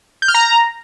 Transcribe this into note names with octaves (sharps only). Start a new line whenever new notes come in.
G6
F6
A#5